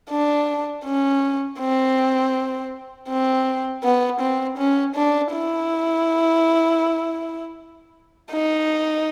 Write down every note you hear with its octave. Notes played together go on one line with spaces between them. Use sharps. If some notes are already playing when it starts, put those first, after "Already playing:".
D4
C#4
C4
C4
B3
C4
C#4
D4
E4
D#4